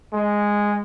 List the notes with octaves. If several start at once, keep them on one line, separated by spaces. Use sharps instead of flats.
G#3